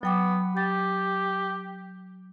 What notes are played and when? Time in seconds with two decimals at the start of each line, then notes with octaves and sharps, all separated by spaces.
0.03 F#3 B3 G5 D6
0.57 G4 A6